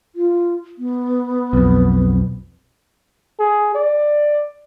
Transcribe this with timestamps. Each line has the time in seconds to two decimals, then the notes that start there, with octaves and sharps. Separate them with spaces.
0.15 F4
0.78 B3
1.53 B1 F2
3.39 G#4
3.75 D5